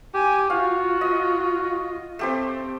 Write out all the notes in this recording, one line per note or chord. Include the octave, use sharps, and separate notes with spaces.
G4 G#5
F4 F#4 F5
D#5
A3 C4 G4 C5